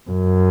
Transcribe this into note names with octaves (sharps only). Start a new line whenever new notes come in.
F#2